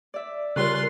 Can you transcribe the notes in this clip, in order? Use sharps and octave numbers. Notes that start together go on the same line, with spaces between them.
D5 E5
C#3 G3 F4 G#4 A#4 C#5 C6 F#6